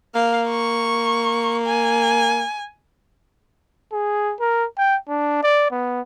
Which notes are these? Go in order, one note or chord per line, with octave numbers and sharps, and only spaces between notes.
A#3 F5
C#6
G#5
G#4
A#4
G5
D4
D5
B3